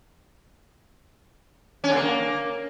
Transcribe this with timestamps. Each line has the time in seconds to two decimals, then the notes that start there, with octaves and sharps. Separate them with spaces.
1.84 C#4
1.90 D3
1.96 A#3